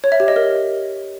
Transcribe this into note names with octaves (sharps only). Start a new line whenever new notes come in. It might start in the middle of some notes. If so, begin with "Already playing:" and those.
C#5
E5
G4
D#5
A#4